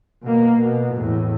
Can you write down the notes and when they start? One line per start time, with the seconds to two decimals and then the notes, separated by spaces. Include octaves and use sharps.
0.23 B2 A#3
0.57 B2
0.94 E2 A2